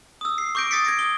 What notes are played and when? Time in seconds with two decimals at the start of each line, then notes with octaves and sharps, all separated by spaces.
0.21 D#6 E6
0.38 C7
0.55 C#6 D6 G6 A#6 D7
0.71 D#6 A6 B6 C#7
0.85 G#6 A#6 D7
0.99 D#6 G7